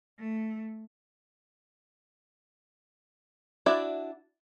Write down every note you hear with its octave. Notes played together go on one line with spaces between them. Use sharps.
A3
D4 E4 F#4 D5 E5